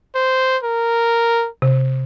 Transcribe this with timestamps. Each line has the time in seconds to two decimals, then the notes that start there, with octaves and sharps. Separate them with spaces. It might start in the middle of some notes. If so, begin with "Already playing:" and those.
0.15 C5
0.63 A#4
1.62 C3